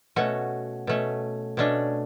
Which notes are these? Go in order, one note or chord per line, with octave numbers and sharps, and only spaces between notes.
B2 A3 C#4 F#4
B2 A3 C#4
B2 A3 C#4 D4